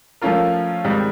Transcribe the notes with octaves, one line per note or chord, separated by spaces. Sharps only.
F3 A3 C#4 F4 A#4
G#2 D#3 G3 C4